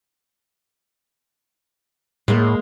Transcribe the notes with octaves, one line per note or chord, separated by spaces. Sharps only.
A2 G#3 A#3